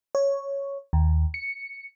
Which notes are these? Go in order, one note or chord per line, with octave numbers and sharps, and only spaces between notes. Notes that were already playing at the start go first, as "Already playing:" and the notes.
C#5
D#2
C#7